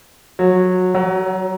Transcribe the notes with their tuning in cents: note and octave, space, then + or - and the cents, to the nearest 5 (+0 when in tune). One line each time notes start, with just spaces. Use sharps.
F#3 -15
F#3 +25